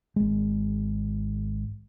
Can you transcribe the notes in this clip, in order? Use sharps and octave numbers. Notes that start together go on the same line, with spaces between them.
G#1 G#3